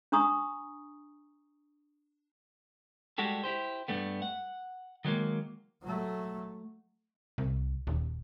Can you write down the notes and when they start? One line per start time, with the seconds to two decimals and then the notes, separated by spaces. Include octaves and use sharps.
0.12 D4 A#5 C#6 D#6
3.18 G3 G#3 F#4 G4 A4
3.44 E4 G4 C5
3.88 G2 G3 A3 B3
4.22 F#5
5.05 D#3 F#3 G#3 A#3
5.83 F#3 A3
7.38 C2
7.87 D#1